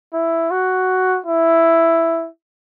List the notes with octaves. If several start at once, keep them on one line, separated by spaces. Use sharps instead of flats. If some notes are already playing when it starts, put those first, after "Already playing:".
E4
F#4
E4